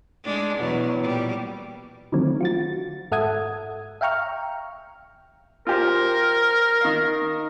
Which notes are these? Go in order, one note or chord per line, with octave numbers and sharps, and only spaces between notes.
G#3 D4
E2 B2 F#3
A#2 G3
D3 D#3 F3 F#3 A3 C4
F4 F#4 A6
G#2 A4 E5 F#5 D#6 G#6
E5 F5 G5 A#5 C#6 F6
F4 G4 A#4 C5
D#3 F5